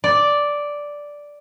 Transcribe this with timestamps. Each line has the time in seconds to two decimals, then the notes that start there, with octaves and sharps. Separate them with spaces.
0.04 D5